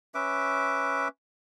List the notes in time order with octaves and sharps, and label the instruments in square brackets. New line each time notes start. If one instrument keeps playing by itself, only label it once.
[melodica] C#4 B4 E5 D6